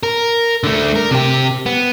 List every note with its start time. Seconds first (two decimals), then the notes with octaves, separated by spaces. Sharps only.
0.03 A#4
0.64 D3 A3
0.96 A#4
1.11 C3 G4
1.66 B3